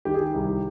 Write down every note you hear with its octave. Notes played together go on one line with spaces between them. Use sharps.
D#3 G4
G#4
G4
C2